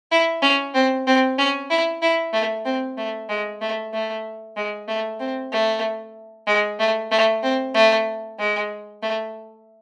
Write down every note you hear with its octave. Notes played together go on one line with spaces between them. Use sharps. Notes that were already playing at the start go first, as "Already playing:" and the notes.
E4
C#4
C4
C4
C#4
E4
E4
A3
C4
A3
G#3
A3
A3
G#3
A3
C4
A3
G#3
A3
A3
C4
A3
G#3
A3